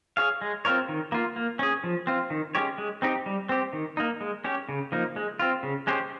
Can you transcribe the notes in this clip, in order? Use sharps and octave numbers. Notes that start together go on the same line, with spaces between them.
G#4 C#5 F5
G#3
C4 F4 A#4 C#5
D#3
A#3 F4
A#3
C#4 G#4
F3
C4 F4
D#3
G#3 C#4 G4 C#5
G#3
C4 D#4 G4
G3
C4 G4
D#3
A#3 D#4
G#3
C#4 G4 C#5
C#3
F3 A#3 D#4
G#3
C4 F4
C#3
G#3 C#4 G4 C5